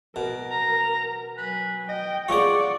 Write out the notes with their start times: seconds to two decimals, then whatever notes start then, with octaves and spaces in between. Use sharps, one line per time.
0.16 B2 A#4
0.51 A#5
1.38 F#3 B4 G#5
1.89 D#5 G5
2.28 F4 G#4 D5 F#5 C#6